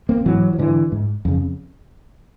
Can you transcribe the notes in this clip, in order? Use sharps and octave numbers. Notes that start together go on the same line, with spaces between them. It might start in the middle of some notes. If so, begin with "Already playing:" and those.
A#3 C4
G#2 E3 F#3
F3
G#2 D3 E3
G#2
F2 C#3